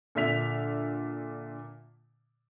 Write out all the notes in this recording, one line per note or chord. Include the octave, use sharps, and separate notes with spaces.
A#2 D3 E5 B6 F7